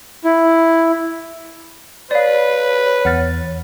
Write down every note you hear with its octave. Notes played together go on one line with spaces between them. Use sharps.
E4
B4 C#5 D5 F5
E2 F#5 F6 A6